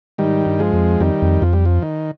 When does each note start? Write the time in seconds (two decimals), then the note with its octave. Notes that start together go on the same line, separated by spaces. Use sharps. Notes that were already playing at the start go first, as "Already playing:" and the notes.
0.18 G#2 D#3 G3
0.46 G2
0.59 F3 G#3
0.73 F2
1.00 F2 D#3 G3
1.22 F2
1.42 F2 F3
1.53 G3
1.65 F3
1.82 D#3